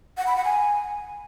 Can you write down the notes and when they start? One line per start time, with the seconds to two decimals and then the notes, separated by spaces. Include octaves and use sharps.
0.18 F#5
0.27 B5
0.36 F#5
0.45 G#5